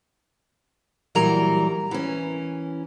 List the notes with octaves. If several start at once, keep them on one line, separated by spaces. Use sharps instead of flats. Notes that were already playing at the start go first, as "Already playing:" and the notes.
A#2 E3 F#3 G3 A#4 A#5
E3 C#4